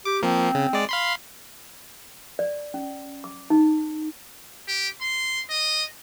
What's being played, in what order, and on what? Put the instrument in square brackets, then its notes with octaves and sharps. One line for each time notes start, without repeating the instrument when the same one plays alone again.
[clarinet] G4 [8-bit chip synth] D6
[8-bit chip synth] F3 A#3 [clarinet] C4
[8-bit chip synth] C#3
G#3 D5
F5 B5 C6
[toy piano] D5
C#4
D6
D#4
[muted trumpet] G4
C6
D#5